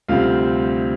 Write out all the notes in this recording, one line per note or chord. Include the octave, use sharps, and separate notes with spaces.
D2 C3 G3 C4 F4 F5